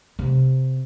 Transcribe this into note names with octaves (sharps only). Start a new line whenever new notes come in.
C3